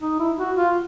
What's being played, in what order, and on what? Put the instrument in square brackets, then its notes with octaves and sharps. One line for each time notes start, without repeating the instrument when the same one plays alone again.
[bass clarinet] D#4
E4
F#4
F4